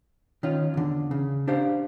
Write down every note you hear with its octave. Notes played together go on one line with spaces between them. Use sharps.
D#3 C#4 F4
E2 D3
C#3
D4 G4 C5 F5